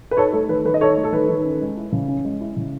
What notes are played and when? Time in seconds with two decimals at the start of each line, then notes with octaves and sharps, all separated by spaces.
0.11 B4
0.17 D#4 A4 C#5
0.33 A3 A4
0.49 D#3 B4
0.65 D#3 B4
0.74 D#5
0.81 D#4 A4 C#5
0.97 A3
1.04 A4
1.12 D#3 B4
1.29 D#3
1.44 C#4
1.61 G#3
1.77 E4
1.92 C#3
2.08 C#4
2.25 G#3
2.41 E4
2.57 C#3